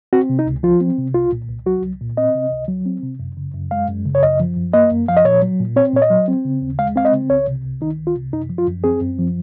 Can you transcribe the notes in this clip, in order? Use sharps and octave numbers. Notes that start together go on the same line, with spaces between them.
C4 F#4
C3
D#4
C#2
F3 F4
C4
C3
C2 F4
A#2
C2
F#3 F#4
C2
A#2
C4 D#5
C3
C#2
F#3
C4
C3
F#2
C#3
F#2
G#3 F5
F#2
C#3
C#5
F#2 D#5
F3
F#2
A#3 D#5
F#2
F3 F5
D#5
A#2 C#5
F#3
A#2
C4 C#5
A#2 C#5
D#5
F#3
C4
C#3
D#2
G#3 F5
C4 F5
D#5
C#3
C2 C#5
C3
C2
D#3 D#4
C2
F4
C3
F#2 D#4
F3
F4
F#2
C4 G#4
F#2
F3